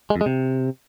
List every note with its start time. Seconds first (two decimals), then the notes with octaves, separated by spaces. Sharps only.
0.10 G#3
0.16 F2
0.21 G#3
0.26 C3